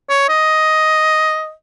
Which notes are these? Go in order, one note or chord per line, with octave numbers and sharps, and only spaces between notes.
C#5
D#5